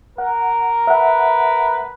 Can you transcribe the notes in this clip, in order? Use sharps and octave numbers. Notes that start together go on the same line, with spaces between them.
A#4 F#5
B4 E5 F#5